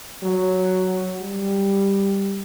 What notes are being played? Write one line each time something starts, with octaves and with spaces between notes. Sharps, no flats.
F#3
G3